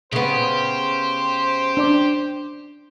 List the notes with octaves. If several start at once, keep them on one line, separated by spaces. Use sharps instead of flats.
C#3 B3 G4 C5
D4 D5 D6